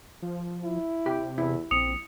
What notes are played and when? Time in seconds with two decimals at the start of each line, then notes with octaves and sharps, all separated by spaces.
0.22 F3
0.64 E4
1.06 C3 G4
1.38 E2 E4
1.71 A#1 C4 D#6 C#7 F7